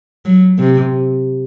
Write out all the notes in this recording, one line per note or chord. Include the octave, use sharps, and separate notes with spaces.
F#3
C3